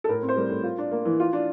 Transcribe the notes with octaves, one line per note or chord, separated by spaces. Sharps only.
A4
A2 A#4
C4
C5
G3 A#4
A2
F4
D4
A#3
E3
F4
D4